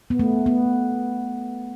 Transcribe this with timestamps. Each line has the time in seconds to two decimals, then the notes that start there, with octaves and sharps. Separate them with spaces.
0.10 B3
0.19 A3
0.46 B3